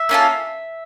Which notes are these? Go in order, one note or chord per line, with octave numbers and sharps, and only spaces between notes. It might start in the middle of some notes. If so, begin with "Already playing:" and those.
Already playing: E5
A#3 C#4 F4 A4